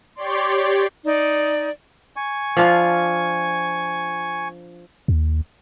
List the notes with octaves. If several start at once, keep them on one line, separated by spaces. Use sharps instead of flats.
G4 C#5 D5 C6
D#4 D5
G#5 C#6
F3 D4 F4
D#2